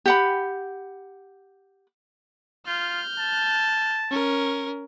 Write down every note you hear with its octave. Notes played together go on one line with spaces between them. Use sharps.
G4 F#5 B5
F4 F6 G6
A5
C#4 A#4